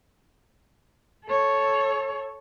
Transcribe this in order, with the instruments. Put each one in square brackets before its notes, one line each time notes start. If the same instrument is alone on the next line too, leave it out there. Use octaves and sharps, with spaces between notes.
[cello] A4 C#5